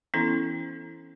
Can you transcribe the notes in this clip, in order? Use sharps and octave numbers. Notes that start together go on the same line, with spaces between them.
E3 B3 C#4 E4 A4